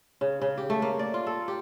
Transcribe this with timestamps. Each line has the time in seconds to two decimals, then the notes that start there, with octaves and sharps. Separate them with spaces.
0.21 C#3
0.41 C#3
0.58 G4
0.70 A3
0.82 A#3
0.99 D5
1.14 F4
1.27 A4
1.48 G4